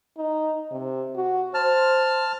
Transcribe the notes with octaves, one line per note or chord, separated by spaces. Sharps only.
D#4
C3
F#4
C5 A5 F6